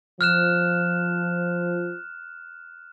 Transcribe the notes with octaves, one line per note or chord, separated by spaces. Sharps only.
F3 F6 F#6 E7